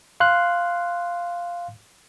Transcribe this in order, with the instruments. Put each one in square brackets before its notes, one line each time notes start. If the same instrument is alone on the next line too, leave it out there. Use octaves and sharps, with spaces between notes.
[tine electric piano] F5 C6 F#6